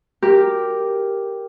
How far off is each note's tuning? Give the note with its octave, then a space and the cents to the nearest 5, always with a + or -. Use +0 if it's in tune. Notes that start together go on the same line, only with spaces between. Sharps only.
G4 +0 A#4 +0